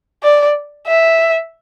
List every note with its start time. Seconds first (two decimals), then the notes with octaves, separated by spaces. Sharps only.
0.23 D5
0.87 E5